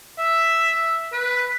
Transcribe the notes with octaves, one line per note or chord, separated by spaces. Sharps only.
E5
B4